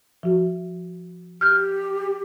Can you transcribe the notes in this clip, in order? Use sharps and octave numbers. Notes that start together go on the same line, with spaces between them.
F3 F#4
G4 F6 G6